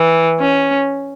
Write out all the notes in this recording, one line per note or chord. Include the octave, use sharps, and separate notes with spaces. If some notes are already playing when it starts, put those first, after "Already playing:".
Already playing: E3
C#4